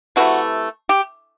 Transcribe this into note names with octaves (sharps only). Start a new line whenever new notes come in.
C3 E3 A3 F#4
G4